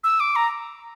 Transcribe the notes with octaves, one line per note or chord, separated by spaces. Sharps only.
E6
D6
A#5